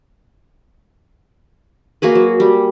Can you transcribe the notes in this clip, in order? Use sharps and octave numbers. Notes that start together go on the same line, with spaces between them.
A#3 F#4 G#4 B4
F#3
G3